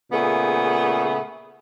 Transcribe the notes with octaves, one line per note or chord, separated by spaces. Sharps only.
A#2 C#3 A3 B3 G#4